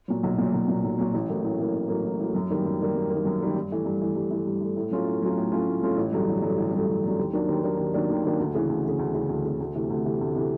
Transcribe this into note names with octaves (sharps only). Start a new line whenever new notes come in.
A#2 F#3
B1
A#2 F#3
B1
A#2 F#3
B1
A#2 F#3
A1
A2 F#3 A#3
A1
A2 F#3 A#3
A1
A2 F#3 A#3
A1
A2 F#3 A#3
F#2
D#3 G3 A#3
F#2
D#3 G3 A#3
F#2
D#3 G3 A#3
F#2
D#3 G3 A#3
G2
E3 A3
G2
E3 A3
G2
E3 A3
G2
E3 A3
A2
F#3 A3 C#4 F4
A2
F#3 A3 C#4 F4
A2
F#3 A3 C#4 F4
A2
F#3 A3 C#4 F4
A1
G2 D3 F#3 A3
A1
G2 D3 F#3 A3
A1
G2 D3 F#3 A3
A1
G2 D3 F#3 A3
D#2
D#3 F#3 A#3 D4
D#2
D#3 F#3 A#3 D4
D#2
D#3 F#3 A#3 D4
D#2
D#3 F#3 A#3 D4
D2
C#3 E3
D2
C#3 E3
D2
C#3 E3
D2
C#3 E3
D2
C3 E3 A3
D2
C3 E3 A3
D2
C3 E3 A3